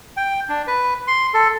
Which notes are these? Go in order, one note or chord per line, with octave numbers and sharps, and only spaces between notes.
G5
D4
B4
C6
A4